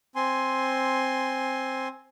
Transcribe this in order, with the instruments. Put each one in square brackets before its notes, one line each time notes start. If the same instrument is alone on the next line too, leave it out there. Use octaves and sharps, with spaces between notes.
[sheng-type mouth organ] C4 G#5 C6